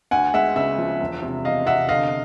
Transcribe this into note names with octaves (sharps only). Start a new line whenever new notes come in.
D2 F#5 G#5
G#3 E5 F#5
C#3 E5
F3
E1
C3
E1 D#5 F5
C3 E5 F#5
D3 D#5 F5